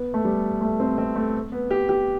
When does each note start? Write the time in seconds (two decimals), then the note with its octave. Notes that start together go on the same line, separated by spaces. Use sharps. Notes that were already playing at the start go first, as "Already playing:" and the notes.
Already playing: B3
0.14 A3
0.25 G3
0.61 A3
0.80 C4
0.98 C4
1.16 A3
1.52 B3
1.71 G4
1.89 G4